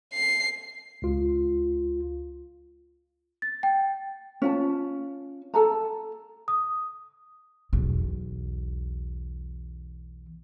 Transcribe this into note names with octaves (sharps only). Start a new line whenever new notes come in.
C7
C#2 F4
A6
G5
C#4 F4 A5
A4 A5 A#5
D#6
B1 E2